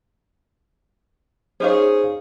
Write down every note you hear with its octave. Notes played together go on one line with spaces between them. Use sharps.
C#4 D#4 G#4 C5 C#5 F5